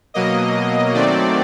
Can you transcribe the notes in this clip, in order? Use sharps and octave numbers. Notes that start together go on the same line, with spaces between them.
B2 F#3 A#3 D#5
D#3 F#3 A3 C4 D5